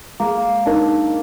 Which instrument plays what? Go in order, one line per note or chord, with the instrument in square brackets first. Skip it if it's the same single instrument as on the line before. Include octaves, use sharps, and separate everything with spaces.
[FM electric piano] G#3 [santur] A#3
[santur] D4 [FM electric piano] D#4 A#4